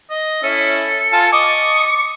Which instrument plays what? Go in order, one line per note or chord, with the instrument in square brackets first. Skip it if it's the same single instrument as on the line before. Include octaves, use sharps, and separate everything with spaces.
[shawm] D#5
[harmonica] C#4 E4 E5 [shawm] A4
[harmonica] F4 G#5 A5
[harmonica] D#5 D6 [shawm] C#6